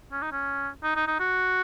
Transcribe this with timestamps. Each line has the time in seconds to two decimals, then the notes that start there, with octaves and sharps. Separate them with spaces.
0.12 C#4
0.22 D#4
0.32 C#4
0.84 D#4
0.96 D#4
1.07 D#4
1.20 F#4